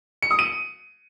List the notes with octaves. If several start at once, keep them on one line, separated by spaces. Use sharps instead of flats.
C#7
D#6
D#7